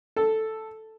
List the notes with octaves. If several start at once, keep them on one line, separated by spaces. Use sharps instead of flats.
A4